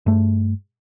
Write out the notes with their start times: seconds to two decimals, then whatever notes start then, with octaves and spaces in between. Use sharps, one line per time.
0.06 G2 A3